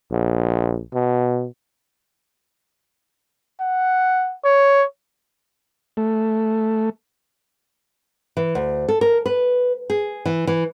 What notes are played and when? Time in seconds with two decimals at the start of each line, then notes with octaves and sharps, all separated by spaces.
0.12 A#1
0.94 B2
3.61 F#5
4.45 C#5
5.97 A3
8.37 E3
8.55 D2
8.88 A4
9.01 A#4
9.26 B4
9.90 G#4
10.25 E3
10.47 E3